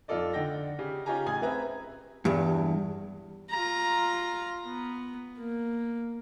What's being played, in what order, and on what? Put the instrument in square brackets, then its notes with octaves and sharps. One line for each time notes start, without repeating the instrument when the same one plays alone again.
[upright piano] F2 D#4 F4 A4 D5 D#5
D3 D#4 F#5 G5 A#6
C#3 G4
C#4 D#4 F4 G4 G#5 A#5
A1 G#4 G#5 D#6 G#6
C4 B4 E5 A#5
[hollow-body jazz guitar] E2 G2
[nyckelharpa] F4 A#5
B3
A#3